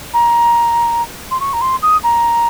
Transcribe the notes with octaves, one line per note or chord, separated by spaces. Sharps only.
A#5
C6
C#6
A#5
C6
D#6
A#5